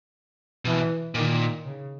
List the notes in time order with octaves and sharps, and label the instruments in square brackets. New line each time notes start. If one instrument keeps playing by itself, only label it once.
[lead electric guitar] B2 [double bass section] E3
[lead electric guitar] A#2 [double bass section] D#3
[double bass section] C#3